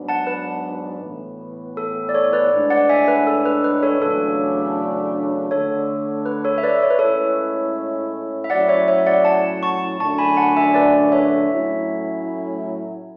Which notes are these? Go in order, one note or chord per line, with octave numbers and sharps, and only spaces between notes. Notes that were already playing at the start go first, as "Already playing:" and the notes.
Already playing: G#2 F#3 B3 D4
F#5 A5
B4
A2 E3 B3
A4
D5
A4 C#5
B4 D5
A2 G#3 D4
D5 F#5
E5 G#5
B4
A4
B4
B4
A4 C#5
E2 C#3 F#3 A3 D4 A4
D3 A3 D4 A4 C#5
B4
A4 C#5
E5
B4 D5
C#5
B4
A2 G#3 C#4 E4 A4 C#5
E5
A2 F#3 C#4 E4 D5 F#5
C#5 E5
C#5 E5
D5 F#5
F#5 A5
A5 C#6
F#2 D3 A3 D4 A5 C#6
G#5 B5
F#5 A5
E5 G#5
B4 D5
C#5 E5
A2 F#3 A3 C#4 E4